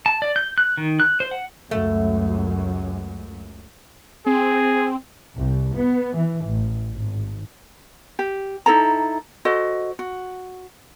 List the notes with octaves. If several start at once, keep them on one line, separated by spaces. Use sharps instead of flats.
A5
D5
G6
F#6
D#3
F#6
C5
F#5
C#2 F#2 A3
C4 G#4
C2
B3
E3
A1
G#1
G4
D#4 E4 A4 A#5
F#4 A4 C5 D#5
F#4